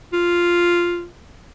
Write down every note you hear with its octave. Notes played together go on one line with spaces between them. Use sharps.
F4